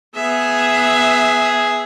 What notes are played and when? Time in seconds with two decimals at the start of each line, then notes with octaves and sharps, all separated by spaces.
0.15 B3 G#4 E5